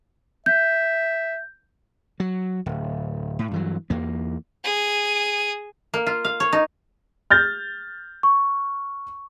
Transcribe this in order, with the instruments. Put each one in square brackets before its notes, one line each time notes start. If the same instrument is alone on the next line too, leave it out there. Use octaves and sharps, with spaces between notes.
[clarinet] E5 [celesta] G6
[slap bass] F#3
D1
A2
G2 E3 F#3
E2 A#3
[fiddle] G#4 D#6
[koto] A#3
F4
F5
C#5
D#4
[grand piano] F6 G6 A6
[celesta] C#6